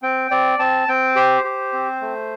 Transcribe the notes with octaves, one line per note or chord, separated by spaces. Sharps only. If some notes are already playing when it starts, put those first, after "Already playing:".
C4 G5
C4 D5
C4 A5
C4 G5
G4 C5
G4
C4
A3